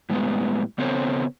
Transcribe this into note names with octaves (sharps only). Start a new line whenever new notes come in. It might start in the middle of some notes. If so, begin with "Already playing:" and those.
A2 G3 G#3 B3
C#3 B3 C4 A4 C5 C#5